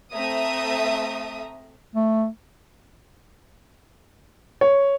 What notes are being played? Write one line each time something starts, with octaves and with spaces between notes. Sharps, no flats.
A3 C4 E5 A#5 D#6
A3
C#5